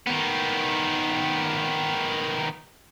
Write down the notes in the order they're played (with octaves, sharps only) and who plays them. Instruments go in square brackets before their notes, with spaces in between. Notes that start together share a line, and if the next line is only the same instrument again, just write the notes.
[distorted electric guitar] D#3 B3